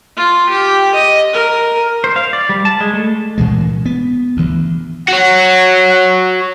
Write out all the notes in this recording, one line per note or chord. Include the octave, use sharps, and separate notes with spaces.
F4
G4
D#5
A#4
C5
F5
D5
G3
A5
G#3
A3
D2 A#2 E3 G#3
B3
D2 E3
F#4 C#5 F#5